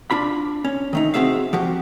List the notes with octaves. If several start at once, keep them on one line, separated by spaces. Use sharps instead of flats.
D4 F4 B5
C#4
D#3 A3 D#4
C4 F#4 G#4 E5 F5
F3 F#4 G4